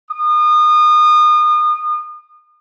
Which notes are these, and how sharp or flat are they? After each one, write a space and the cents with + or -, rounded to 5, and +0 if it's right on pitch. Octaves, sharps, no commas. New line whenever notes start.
D#6 -30